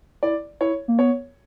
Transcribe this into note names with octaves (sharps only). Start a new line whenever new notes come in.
E4 D5
E4 C#5
A#3
B3 C#5